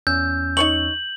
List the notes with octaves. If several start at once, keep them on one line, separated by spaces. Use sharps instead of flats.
E2 C#4 E6 G6
D#4 C#5 C#6 F#7